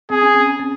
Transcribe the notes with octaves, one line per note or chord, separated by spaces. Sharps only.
C4 G#4
C#4
C4
C#4
C4